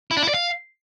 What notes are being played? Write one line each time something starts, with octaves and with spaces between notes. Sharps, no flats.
E4
D4
E4
D5
F5